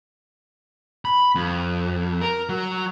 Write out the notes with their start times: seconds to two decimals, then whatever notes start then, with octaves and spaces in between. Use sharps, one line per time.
1.05 B5
1.35 F2
2.22 A#4
2.49 F#3